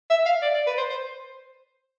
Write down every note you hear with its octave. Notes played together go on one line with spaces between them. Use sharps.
E5
F5
D5
D5
B4
C5
C5